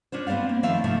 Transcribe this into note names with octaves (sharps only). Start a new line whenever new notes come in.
C#4 D4 F4 C5
B3 C4 C5 D5 F5
A#3
D#3 F3 A3 E5 F5
C3 E3 F3 A3 D#4